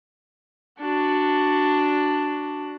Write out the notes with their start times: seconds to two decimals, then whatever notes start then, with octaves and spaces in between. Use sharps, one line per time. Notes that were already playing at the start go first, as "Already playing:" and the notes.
0.81 D4 F#4